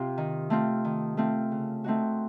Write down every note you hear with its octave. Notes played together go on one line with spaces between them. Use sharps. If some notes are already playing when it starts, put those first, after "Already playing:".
Already playing: C3 C4 F4
D#3
A3 C4 F4
D#3
A3 C4 F4
C#3
A3 C4 D#4 F#4